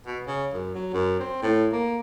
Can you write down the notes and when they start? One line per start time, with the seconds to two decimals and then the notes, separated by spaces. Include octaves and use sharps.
0.06 B2
0.27 C#3
0.53 F#2
0.74 F#3
0.93 F#2
1.20 C4
1.42 A2
1.72 A#3